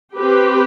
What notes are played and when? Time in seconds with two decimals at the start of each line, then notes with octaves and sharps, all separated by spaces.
0.18 C4 G4 B4